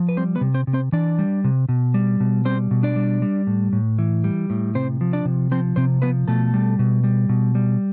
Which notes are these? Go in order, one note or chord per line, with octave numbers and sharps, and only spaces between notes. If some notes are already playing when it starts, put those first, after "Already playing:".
Already playing: F3
B4
G3 C4 C5
B3 B4
C3
C4 C5
C3
C4 C5
E3 D4 D5
G3
C3
B2
G3
B2
G3 C4 C5
B2
D4 D5
G3
G3
A2
A2
E3
G3
A2
C3 C4 C5
F3
D4 D5
C3
F3 C4 C5
C3 C4 C5
F3 B3 B4
B2 A3 A4
G3
B2
G3
B2
G3